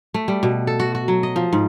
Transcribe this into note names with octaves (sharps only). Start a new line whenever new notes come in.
A3
G3
B2
A4
F#4
F#4
F#3
D#5
F3
G#2